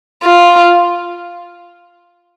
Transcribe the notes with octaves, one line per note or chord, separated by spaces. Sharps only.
F4